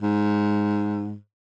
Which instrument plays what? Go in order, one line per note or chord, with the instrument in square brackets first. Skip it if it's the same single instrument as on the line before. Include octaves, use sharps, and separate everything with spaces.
[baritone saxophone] G#2